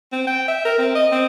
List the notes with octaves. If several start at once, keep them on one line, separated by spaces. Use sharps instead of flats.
C4
G5
E5
A#4
C4
D#5
C4